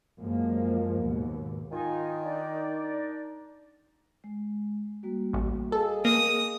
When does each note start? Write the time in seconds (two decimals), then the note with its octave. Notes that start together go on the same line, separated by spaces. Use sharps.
0.21 F#2 F3 G#3 A#3
1.02 D#2 G#2 B2
1.72 D#3 D#4 F4 G#5
2.24 D4 D#4 D5
4.24 G#3
5.03 G3 A#3 F#4
5.33 A1
5.72 G#4 A4 D#5 F5
6.05 A#3 D#6